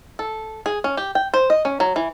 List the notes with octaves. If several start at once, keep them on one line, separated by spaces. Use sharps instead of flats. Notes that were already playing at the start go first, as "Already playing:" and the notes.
A4
G#4
C#4
G4
G5
C5
D#5
C#4
F#3
E3